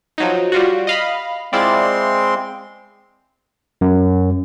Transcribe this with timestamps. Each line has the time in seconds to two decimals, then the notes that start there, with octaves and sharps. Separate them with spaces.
0.18 F3 F#3 D#4
0.52 G3 F4 F#4
0.87 D#5 F5 B5
1.53 G#3 C4 E4 F4 D5 C6
3.81 F#2